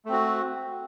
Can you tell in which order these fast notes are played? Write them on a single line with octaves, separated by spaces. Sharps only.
A3 C4 F#4